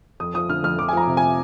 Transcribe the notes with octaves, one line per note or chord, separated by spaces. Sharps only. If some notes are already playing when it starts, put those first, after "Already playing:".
F2 D#6
F3 D#6
D3 F6
F2 F6
F2 D6
G#5
F3 A#5
C3
G#5